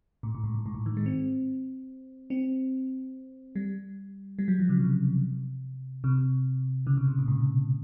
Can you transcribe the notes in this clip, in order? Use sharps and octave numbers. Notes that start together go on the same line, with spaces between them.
A2
A2
G#2
A2
G#2
A2
D#3
G#3
C4
C4
G3
G3
F#3
F3
C#3
C3
C3
C#3
C3
B2
A#2
G#2